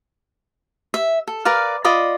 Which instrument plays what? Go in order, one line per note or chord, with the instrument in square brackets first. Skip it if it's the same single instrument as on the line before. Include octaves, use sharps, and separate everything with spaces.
[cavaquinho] E5
A4
A#4 B4 D5 F5
F4 D5 D#5 B5